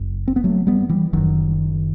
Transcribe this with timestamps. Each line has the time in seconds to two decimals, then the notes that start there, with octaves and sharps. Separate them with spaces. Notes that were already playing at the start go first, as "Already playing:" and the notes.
Already playing: F#1 F#2
0.28 C4
0.36 B3
0.44 F#3 A3
0.67 G3 B3
0.89 E3 G3
1.13 F#1 F#2 D#3 F#3